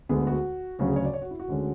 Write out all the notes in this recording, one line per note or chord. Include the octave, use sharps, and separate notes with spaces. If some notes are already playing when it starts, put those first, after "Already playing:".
D2 D3 G#3 B3 G#4
F#4
D2 C#3 F#3 C#4 F#4
G#4
C#5
D5
C#5
F#4
E4
F#4
D2 D3 G#3 C#4